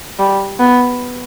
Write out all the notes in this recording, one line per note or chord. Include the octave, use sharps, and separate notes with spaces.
G3
B3